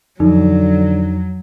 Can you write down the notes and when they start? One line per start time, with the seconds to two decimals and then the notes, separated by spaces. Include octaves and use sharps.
0.20 F2 D3 F#3 D#4